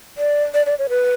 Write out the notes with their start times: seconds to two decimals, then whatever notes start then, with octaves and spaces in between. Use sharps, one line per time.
0.18 D5
0.54 D5
0.66 D5
0.79 C#5
0.89 B4